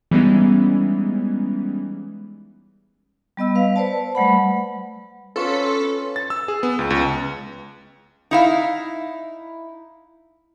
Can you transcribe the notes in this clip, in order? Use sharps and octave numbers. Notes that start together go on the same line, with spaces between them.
E3 G3 G#3 B3 C#4 D#4
G3 B3 D#5 E6
B4 F5
B4 C5 D5 A5
G3 A3 F#5 B5
C#4 F4 A4 B4 C#5 D6
A6
E6
G#4
B3
C#2
C#2
D#4 E4 F5